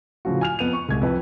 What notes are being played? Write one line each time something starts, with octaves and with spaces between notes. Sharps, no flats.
A2 C#3 F3 F4 F#4
G#5 F6 F7
F2 B3 D#7 F7
C#6
C2 G#3 G#6
F2 B4 G5